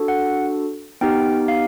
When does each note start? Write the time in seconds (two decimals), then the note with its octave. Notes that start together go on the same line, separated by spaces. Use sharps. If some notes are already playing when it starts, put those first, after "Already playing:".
Already playing: D4 F#4 A4
0.08 F#5
1.01 B3 D#4 G4 G5
1.48 F5